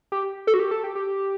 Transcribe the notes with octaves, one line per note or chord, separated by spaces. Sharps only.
G4
A4
F#4
G4
A4
G4
G4